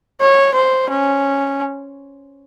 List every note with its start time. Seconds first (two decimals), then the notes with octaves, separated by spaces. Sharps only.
0.21 C#5
0.55 C5
0.90 C#4